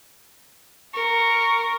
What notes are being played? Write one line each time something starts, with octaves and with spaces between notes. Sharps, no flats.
A#4 C#6